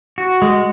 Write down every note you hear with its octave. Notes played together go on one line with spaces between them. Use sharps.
F#4
G#3